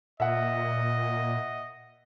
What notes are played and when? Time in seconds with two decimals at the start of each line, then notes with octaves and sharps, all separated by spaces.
0.20 A#2 D#5 E5 F#5